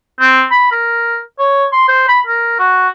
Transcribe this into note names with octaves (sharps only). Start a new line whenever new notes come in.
C4
B5
A#4
C#5
C6
C5
B5
A#4
F#4